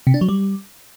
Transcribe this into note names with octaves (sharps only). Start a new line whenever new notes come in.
C3
D4
F#3
G3